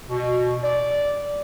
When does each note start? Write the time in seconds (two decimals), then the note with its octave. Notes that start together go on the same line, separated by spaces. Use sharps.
0.09 B2
0.63 D5